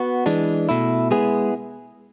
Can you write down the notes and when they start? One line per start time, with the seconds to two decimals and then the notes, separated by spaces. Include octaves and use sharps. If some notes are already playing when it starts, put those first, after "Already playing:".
Already playing: B3 F#4
0.26 E3 G#3 D4
0.69 B2 A3 E4
1.11 G#3 B3 E4 G#4